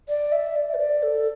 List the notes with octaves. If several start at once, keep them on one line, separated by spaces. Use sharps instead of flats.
D5
E5
D5
B4
D5
A4